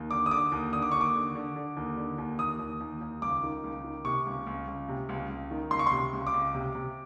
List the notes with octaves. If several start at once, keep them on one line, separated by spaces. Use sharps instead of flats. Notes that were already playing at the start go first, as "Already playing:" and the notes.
Already playing: D#2
D3 D6
D#6
D3 D6
D#2
D3 D#6
D6
D#2 C#6
D6
D3
D3
D3
D#2
D3
D#2
D#2 D#6
D#2
D#2
D#2
C#2 D6
D#3
C#2
D#3
C3 C#6
C#2
C#2
C#2
C3
C#2
C#2
D#3
C#2 C6
C#6
C3 C6
C#2
D6
C#2
C3
C3